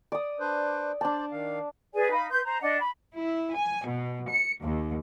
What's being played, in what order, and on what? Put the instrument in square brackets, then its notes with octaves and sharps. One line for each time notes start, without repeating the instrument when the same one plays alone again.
[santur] D5 D#6
[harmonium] D4 B4 C5
[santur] D4 A5 [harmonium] C5 D5
[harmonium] D#3 F5
[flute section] G#4 B4 D5 G#5
D#4 F5 B5
B4 C6 G6
C5 A#5
D4 D#5 F#5
B5
[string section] E4
G#5
B2
C#7
D#2